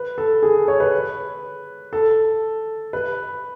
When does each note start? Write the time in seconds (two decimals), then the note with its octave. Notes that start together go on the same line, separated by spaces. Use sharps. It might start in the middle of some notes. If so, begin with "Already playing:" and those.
Already playing: B4
0.18 A4
0.42 G#4
0.68 C#5
0.80 B4
1.93 A4
2.93 B4